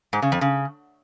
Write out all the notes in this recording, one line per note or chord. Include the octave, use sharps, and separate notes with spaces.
G#2
C#3
F2
C#3